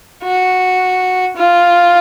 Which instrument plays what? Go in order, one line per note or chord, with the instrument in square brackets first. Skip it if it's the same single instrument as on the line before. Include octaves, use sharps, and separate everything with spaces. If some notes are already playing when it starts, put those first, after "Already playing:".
[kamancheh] F#4
F4